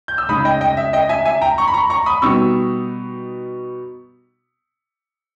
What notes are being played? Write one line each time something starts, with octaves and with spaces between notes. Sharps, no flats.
G6
E6
C#3 G#3 D#4 B5 D#6
D#5 G5
D#5 G5
E5
D#5 G5
E5 G#5
E5 G#5
G5 A#5
A#5 C#6
B5
A#5 C#6
A#5 C#6
B5 D#6
B2 G3 B3 D#4 C#6 E6